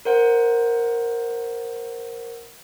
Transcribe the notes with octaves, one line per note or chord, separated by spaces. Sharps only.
A#4 C5 F#5